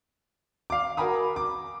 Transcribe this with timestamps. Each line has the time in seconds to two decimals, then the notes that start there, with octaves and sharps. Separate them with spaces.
0.70 F5 D6
0.97 F#4 A#4 G#5 A#5 B5 D#6
1.36 D6